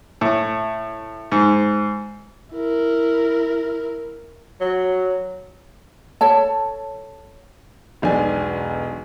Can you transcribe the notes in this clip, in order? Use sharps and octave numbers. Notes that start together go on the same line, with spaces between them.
A2
G#2
E4 A#4
F#3
A4 C#5 A5
E1 B1 D4 G#5